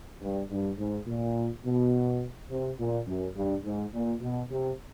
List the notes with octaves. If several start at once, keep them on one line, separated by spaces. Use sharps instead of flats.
G2
G2
G#2
A#2
B2
C3
A#2
F#2
G2
G#2
A#2
B2
C3